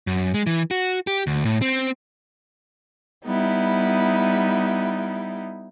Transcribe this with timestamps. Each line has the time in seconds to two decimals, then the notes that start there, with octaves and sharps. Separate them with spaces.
0.07 F#2
0.34 G#3
0.47 E3
0.71 F#4
1.07 G4
1.27 D2
1.45 A2
1.62 C4
3.25 G3 B3 D#4 E4